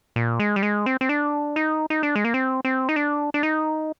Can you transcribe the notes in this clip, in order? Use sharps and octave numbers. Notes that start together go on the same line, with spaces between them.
A#2
G#3
G3
G#3
C4
C4
D4
D#4
D#4
D4
G#3
A#3
C4
C4
D#4
D4
D4
D#4